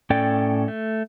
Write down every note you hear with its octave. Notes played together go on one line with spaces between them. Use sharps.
A2 C#4 A4 D5 G5
A3